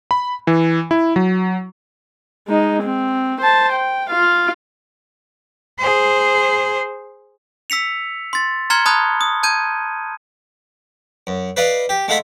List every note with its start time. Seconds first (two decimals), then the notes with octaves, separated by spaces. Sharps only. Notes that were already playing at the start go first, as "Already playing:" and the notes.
0.11 B5
0.47 E3
0.91 E4
1.16 F#3
2.48 G#3 D#4
2.83 C4
3.41 C5 A5
3.73 G5
4.10 F4 F5
5.79 G#4 C5
7.70 E6 B6 C#7 F7
8.33 C6 A6
8.70 A#5 C6 F6 G#6 C#7 G7
8.86 A5 B5 D#6 F#6 G#6
9.21 D#6
9.43 A5 G6 G#6 D#7
11.27 F#2
11.57 B4 D5 D#5 F5
11.89 G4
12.08 G#3 A3 F4 F#5 B5